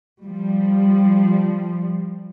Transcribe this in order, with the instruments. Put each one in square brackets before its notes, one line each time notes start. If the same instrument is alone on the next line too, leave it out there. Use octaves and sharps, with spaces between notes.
[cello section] F3 G3